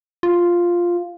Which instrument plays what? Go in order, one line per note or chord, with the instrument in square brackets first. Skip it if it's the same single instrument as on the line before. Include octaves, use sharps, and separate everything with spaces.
[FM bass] F4